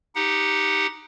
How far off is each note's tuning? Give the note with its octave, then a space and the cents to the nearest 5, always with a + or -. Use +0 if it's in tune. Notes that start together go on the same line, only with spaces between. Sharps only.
D#4 +0 G4 +0 F#5 +0